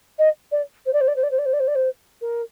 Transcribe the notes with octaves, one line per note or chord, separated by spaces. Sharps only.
D#5
D5
C5
D5
C5
D5
C5
D5
C5
D5
C5
D5
C5
D5
C5
A#4